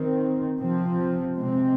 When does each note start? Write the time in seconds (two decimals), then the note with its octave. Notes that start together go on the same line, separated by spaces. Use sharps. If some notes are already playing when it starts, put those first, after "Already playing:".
Already playing: D#3 C4
0.59 C3 F3 C4
1.38 C3 G#3 C4